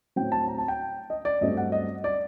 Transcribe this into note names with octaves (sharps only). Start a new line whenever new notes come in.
A2 F#3 C4 G5
A5
A#5
A5
G5
D#5
D5
G2 F#3 A3 C4 D#5
F#5
D#5
D5